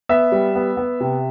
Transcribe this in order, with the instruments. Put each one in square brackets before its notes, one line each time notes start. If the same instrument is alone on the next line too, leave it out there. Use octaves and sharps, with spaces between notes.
[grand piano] B3 E5
G3
B3
B3
C3